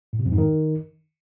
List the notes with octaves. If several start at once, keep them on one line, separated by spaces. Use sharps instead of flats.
A2
C3
F2
G#2
D#3